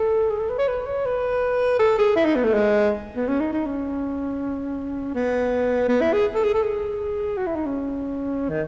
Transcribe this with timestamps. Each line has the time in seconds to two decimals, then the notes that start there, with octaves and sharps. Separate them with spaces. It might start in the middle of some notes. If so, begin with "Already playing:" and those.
Already playing: A4
0.30 G#4
0.39 A4
0.49 B4
0.58 C#5
0.68 B4
0.86 C#5
1.06 B4
1.79 A4
1.98 G#4
2.16 E4
2.25 D#4
2.35 B3
2.44 A3
2.54 G#3
3.16 B3
3.28 C#4
3.40 D#4
3.53 D#4
3.66 C#4
5.15 B3
5.88 B3
6.01 E4
6.13 G#4
6.35 A4
6.44 G#4
6.54 A4
6.63 G#4
7.37 F#4
7.47 E4
7.56 D#4
7.66 C#4
8.49 D#3